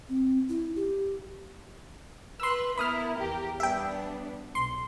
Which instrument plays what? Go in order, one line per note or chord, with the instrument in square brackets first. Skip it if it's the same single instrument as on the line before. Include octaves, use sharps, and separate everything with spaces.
[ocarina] C4
E4
G4
[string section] B4 [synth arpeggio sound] C6 E6
[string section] B3 E4 A#4 [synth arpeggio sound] B5 D#6 F6
[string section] E2 G4 A#4
[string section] G3 B3 D4 [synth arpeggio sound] E5 G5
[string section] B1 [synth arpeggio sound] C6